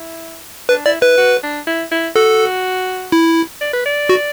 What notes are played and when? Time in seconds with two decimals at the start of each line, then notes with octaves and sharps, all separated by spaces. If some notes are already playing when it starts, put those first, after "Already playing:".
Already playing: E4
0.69 D4 B4
0.86 E4 D5
1.01 E4 B4
1.17 F#4
1.43 D4
1.67 E4
1.91 E4
2.16 F#4 A4
3.12 E4
3.61 D5
3.73 B4
3.86 D5
4.09 F#4